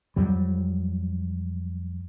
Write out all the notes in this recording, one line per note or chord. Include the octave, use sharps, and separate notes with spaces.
F2 F#3 G3